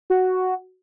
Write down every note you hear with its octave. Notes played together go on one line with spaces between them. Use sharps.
F#4